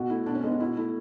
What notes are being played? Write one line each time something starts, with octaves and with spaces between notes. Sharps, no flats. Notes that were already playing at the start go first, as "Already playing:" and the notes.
Already playing: B2 F#4
A3 E4
B2 D4
C#4
G#3 B3
C#4
B2 E4
A3 E4